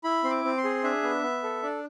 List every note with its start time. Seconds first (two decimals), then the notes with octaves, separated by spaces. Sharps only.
0.04 E4 B5
0.24 C4 C6
0.30 D6
0.44 C4
0.57 C6
0.64 G#4
0.84 D4 E5
1.03 B3
1.23 B3
1.43 A4
1.63 D4 D5